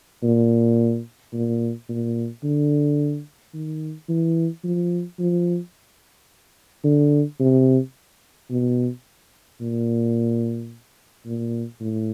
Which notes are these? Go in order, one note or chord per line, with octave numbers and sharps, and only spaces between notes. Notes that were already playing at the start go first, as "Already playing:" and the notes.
A#2
A#2
A#2
D3
D#3
E3
F3
F3
D3
C3
B2
A#2
A#2
A2